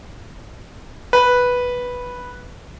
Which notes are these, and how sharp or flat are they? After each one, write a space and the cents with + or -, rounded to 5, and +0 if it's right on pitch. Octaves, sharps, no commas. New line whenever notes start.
B4 -5